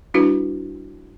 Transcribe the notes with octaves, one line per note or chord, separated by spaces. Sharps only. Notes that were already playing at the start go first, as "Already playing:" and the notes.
G3 D4 E4 F#4 B4